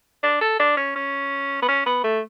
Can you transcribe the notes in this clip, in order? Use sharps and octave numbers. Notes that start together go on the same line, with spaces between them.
D4
A4
D4
C#4
C#4
B3
C#4
B3
A3